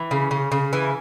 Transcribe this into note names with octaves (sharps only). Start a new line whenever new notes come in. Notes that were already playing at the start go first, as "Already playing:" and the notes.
Already playing: E3
C#3
C#3
C#3
E3